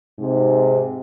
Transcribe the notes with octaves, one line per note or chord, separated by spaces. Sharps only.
G#2 C3